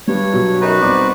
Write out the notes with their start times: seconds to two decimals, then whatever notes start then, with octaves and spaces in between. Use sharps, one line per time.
0.07 G2 G3 C#5
0.33 B2 F#3
0.61 F#2 D#4 F#4 B4
0.81 C2 B3 C5 D5 D6